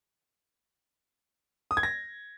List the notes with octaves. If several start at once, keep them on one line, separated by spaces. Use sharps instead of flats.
D#6
G#6
A#6